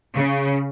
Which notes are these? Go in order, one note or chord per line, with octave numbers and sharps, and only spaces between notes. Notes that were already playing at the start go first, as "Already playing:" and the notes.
C#3